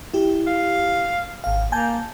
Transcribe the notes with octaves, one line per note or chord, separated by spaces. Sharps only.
E4 G4
F5
G#1 F5
A#3 G#5 A5 G6